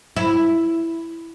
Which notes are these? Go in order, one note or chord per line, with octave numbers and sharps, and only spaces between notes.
E4